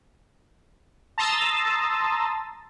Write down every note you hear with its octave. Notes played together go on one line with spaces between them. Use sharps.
A5 A#5 C6 D#6 E6 A6